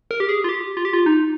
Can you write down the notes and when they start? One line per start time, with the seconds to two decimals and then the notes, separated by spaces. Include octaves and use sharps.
0.11 A#4
0.20 G4
0.29 G#4
0.44 F4
0.49 G4
0.77 F4
0.85 G4
0.93 F4
1.06 D#4